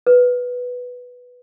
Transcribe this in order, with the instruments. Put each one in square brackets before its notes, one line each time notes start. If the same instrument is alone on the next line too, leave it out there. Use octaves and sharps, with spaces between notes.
[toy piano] B4